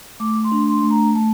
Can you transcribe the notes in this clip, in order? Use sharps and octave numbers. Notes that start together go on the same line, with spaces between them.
A3 D6
C6
D4
C6
A3
A#5
A3 A5